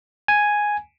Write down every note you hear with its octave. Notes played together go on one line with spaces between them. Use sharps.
G#5